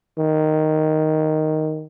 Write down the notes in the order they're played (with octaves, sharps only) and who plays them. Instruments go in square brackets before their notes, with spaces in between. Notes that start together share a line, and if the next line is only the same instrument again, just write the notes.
[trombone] D#3